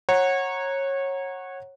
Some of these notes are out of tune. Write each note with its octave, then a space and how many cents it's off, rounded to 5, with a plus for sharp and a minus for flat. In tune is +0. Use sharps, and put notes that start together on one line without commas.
C#5 -20 F#5 +0 A#5 +0